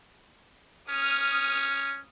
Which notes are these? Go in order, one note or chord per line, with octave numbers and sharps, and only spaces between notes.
C#4 D#6 F6